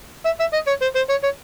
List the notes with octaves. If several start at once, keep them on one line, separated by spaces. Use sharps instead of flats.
E5
E5
D#5
C#5
C5
C5
C#5
C#5